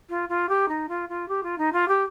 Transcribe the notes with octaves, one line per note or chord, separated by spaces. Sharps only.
F4
F4
G4
D#4
F4
F4
G4
F4
D#4
F4
G4